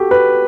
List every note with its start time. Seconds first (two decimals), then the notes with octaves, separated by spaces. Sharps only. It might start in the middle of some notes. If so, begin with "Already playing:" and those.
Already playing: F#4 G4 A4
0.11 B4